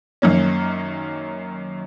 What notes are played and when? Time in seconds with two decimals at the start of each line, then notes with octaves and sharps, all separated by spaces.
0.22 F#2 D#3 A#3 C#4